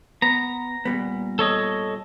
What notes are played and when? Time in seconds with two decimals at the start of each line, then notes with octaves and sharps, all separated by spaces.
0.22 B3 A#5
0.85 A#2 G3 B3
1.39 A4 C#5 D#5